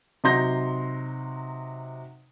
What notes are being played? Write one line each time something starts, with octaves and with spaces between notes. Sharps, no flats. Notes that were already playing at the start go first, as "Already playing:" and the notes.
C3 F#3 D#4 C6 G6 A#6